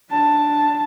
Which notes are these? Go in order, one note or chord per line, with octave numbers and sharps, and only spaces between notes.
D4 A5